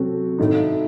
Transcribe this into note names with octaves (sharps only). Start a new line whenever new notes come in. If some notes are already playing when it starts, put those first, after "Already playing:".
Already playing: C3 F#3 C4 F#4 A4
A2 A3 D#4